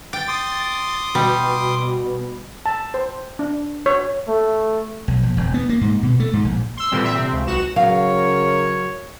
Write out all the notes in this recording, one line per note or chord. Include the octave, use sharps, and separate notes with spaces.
G5 D6 A6
C6 D6 D#6
B2 G3
A5
C5
D4
C#5
A3
B1
A#1
E1
B3
A#3
G#2
B2
A3
G#2
A#1
C6 E6
A#2 D3 E3 G3 C4
C4 E5
C3 C4
C#2
B1 F#4 E7
C#3 F#3 A#4 C#5 F5